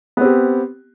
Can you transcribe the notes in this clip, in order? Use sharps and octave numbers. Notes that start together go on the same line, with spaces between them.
B3 C4 G4